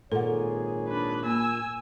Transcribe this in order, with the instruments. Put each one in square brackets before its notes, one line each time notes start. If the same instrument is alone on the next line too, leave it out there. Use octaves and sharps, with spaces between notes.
[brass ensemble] G#1 G#4 C#5 [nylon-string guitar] A#2 [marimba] A4 F#5
[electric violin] D4 B4
[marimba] A#3 [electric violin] G#5 E6